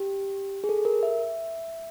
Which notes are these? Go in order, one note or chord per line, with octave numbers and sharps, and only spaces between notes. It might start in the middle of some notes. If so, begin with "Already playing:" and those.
Already playing: G4
G#4
A4
A#4
E5